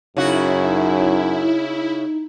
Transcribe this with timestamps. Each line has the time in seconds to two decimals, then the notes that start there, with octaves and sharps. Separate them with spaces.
0.17 F#2 C#3 D#4 E4 F#4